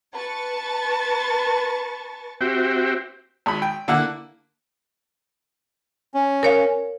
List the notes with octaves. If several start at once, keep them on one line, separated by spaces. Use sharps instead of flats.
B4 A5 C#6 A6
C4 F#4 G4 C5 E5 G5
G#1 B5
G5
D3 A#3 E4 F#5
C#4
A#4 C#5 F5